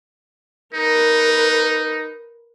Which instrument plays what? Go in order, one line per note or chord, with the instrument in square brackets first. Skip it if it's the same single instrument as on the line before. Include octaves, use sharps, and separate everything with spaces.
[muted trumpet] D#4 [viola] A#4 B4